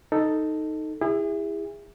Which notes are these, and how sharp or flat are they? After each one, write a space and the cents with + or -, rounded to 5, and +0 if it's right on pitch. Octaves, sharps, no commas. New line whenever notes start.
D#4 +0 A4 +5
E4 +0 G#4 -35